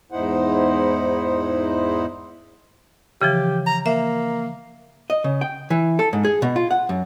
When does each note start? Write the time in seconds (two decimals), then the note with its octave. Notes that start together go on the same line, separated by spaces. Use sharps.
0.12 E2 G#2 D#4 E4 C5 F#5
3.22 C#3 E3 F3 G4
3.66 A#5
3.86 A#3 E5
5.10 D#5
5.24 C#3
5.41 G5
5.70 E3
5.99 A4
6.13 G#2
6.25 G#4
6.42 B2
6.56 F4
6.71 F#5
6.89 F#2